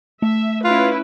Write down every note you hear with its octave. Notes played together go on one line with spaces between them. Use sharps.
A3 E5
C#4 E4 F4 B4